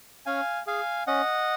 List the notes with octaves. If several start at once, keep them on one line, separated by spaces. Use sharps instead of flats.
C#4 F5 G#5
G#4 F5 G#5
C#4 D#5 F#5